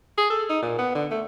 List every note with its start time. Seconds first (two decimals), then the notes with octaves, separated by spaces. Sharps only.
0.18 G#4
0.30 A4
0.49 D#4
0.62 A#2
0.78 B3
0.95 D3
1.11 A3